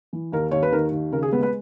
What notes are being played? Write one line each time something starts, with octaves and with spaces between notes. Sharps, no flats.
E3
D#2 A#4
D#2 C#5
B4
D#3 A#4
D#2
C#3 A#4
G#4
G#3 B3 B4
B3 B4